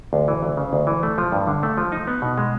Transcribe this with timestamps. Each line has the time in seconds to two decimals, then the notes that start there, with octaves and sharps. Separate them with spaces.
0.13 D2
0.28 E3
0.43 D2
0.57 C#3
0.73 D2
0.87 E3
1.03 A3
1.18 F3
1.32 G2
1.47 D3
1.63 A3
1.78 F3
1.92 D#4
2.07 B3
2.22 B2
2.38 G#3